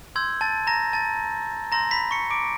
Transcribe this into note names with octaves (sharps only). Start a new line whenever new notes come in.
C6 E6 G6 G#6
A5 A6
A#5 A#6
A5 A6
A#5 C6 E6 G6 A#6
B5 B6
C#6 C#7
D6 D7